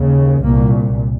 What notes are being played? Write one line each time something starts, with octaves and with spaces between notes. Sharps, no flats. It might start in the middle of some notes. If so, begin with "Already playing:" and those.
Already playing: D#2 C#3
C2 A#2 A#3